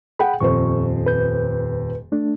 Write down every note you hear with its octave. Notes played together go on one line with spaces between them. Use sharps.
G#4 F#5 G5 B5
D#1 F2 C5 C#6
B4 G6
A3 D4